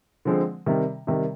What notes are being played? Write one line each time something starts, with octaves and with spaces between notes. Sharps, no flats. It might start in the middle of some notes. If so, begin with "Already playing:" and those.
D3 F3 G#3 C4
C3 D#3 G3
C3 D#3 G3